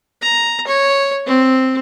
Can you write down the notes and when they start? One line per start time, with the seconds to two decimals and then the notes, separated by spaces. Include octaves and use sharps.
0.22 A#5
0.67 C#5
1.26 C4